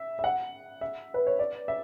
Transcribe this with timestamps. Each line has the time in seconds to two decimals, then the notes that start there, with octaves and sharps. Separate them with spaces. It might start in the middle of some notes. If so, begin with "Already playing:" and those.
Already playing: E5
0.19 E5
0.24 F#5
0.81 E5
1.14 B4
1.27 C#5
1.39 D5
1.68 E5